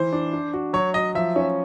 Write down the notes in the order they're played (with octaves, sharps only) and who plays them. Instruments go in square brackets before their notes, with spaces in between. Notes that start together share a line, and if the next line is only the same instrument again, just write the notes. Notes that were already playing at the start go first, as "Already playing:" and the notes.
Already playing: [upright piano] E3 [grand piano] C5
[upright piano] D4
D4
F#4
[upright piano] F#3 [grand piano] C#5
[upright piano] F#3 [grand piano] D#5
[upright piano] F3 [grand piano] E5
[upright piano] C#4